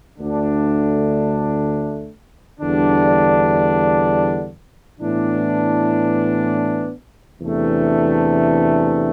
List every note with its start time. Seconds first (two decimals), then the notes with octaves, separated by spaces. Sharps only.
0.18 D2 D3 A3 D4
2.59 E2 D3 G3 D4
4.99 A2 E3 B3 D4
7.41 E2 C3 E3 A3 D4